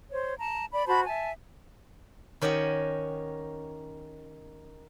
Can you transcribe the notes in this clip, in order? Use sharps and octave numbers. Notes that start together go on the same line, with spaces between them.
C5 C#5
A5 A#5
D5 B5
F#4 C5 A5 B5
E5 G#5 A5
D#3 C#4 G4 D#5 F#5